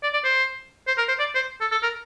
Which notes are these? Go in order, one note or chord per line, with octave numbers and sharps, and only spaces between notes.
D5
D5
C5
C5
A#4
C5
D5
C5
A4
A4
A#4